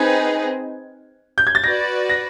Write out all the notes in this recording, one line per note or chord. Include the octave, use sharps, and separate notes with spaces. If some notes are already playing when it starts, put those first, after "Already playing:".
Already playing: C4 D#4 G#4 B4 D#5 G#6
G6
G#6
A6
F#4 B4 D5 A#6
A#6